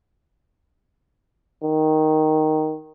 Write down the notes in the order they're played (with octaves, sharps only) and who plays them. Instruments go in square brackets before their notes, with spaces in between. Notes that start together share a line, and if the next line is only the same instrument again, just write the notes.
[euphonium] D#3